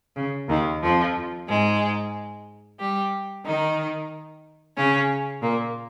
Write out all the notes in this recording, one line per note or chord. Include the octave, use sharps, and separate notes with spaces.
C#3
D#2 D#3
F2 F3
G#2 G#3
G3 G4
D#3 D#4
C#3 C#4
A#2 A#3